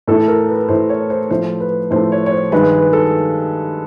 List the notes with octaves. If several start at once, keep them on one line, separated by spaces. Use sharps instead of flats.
A2 E3 A3 A4
A#4
B4
A2 E3 A3 C5
C#5
C5
A2 F3 A3 C5
B4
A2 F3 A3 C5
C#5
C#5
C5
G2 D#3 G#3 B4
B4
A4